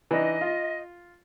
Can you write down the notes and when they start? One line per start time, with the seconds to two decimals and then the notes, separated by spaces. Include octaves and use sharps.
0.11 E3 D4 D#4 D#5
0.41 F4